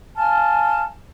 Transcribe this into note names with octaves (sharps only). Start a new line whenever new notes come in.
F5 G#5 A5 F6